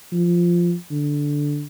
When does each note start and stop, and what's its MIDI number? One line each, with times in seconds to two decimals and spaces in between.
0.12 0.75 53
0.90 1.65 50